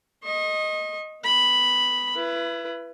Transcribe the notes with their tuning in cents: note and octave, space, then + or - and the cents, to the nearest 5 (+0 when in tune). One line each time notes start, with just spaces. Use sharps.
D#5 +0 C#6 -45
B3 +20 B5 +0
E4 +35 B4 +0